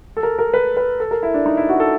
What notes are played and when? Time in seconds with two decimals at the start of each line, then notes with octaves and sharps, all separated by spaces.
0.17 A4
0.23 A#4
0.39 A#4
0.54 B4
0.77 B4
1.00 A4
1.11 A#4
1.23 E4
1.34 D4
1.46 D#4
1.57 E4
1.69 F#4
1.80 A4